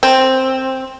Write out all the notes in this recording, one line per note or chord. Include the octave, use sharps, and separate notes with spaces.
C4